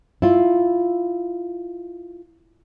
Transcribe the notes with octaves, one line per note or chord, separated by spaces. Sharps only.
E4 F4